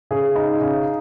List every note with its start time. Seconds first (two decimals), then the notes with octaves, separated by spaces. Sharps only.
0.11 C#3 G#4
0.36 D#4
0.62 C#3